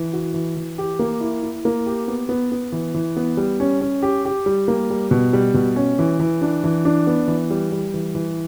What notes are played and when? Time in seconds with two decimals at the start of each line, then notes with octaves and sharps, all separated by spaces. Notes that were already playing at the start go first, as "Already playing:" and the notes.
Already playing: E3
0.13 F#4
0.34 E3
0.57 E3
0.78 G4
0.99 A#3
1.20 E4
1.43 E4
1.65 A#3
1.86 G4
2.08 B3
2.29 B3
2.52 B3
2.72 E3
2.94 E3
3.16 B3
3.37 G3
3.60 C#4
3.81 C#4
4.02 G4
4.25 G4
4.46 G3
4.68 A#3
4.90 G3
5.11 B2
5.33 G3
5.54 B2
5.76 C#4
5.99 E3
6.20 E3
6.41 D4
6.64 E3
6.85 D4
7.07 B3
7.28 E3
7.50 G3
7.72 G3
7.94 E3
8.15 E3